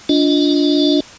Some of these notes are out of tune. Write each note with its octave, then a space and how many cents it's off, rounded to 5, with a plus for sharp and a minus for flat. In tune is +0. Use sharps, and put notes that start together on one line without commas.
D4 -15 F4 +0 D#5 +0